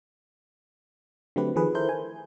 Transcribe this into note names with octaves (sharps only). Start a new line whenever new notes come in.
D3 F#3 A3 C4 G4 B4
D#3 F3 G#4 B4
E4 A4 A#4 C5 G6
G#5